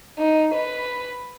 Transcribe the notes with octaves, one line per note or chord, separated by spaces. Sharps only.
D#4
B4